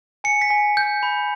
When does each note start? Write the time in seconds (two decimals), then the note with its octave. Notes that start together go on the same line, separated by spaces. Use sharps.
0.24 G#5 C#7
0.41 B6
0.50 G#5
0.77 G6
1.03 B5